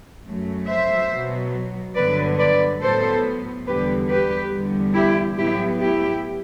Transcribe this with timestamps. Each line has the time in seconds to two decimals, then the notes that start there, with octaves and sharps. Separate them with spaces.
0.25 F#2 F#3 A3
0.67 C5 E5
1.10 B2 F#3 B3
1.95 G2 D3 F#3 B3 B4 D5
2.38 B4 D5
2.81 A2 F#3 B3 A4 C5
3.66 E2 D3 G3 B3 G4 B4
4.09 G4 B4
4.52 E2 D3 G3 B3
4.94 E4 G4
5.38 A2 F#3 B3 E4 G4
5.80 E4 G4